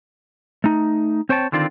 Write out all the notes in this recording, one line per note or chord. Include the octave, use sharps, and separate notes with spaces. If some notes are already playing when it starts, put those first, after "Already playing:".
A3 D#4
C4 C5 C#5 G5 A5
D3 D#3 C4 F4 D5